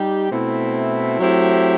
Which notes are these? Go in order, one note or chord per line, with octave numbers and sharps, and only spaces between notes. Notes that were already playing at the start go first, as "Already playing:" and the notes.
Already playing: G3 D#4 G4
B2 A3 C4 E4
F#3 A3 C4 E4 G4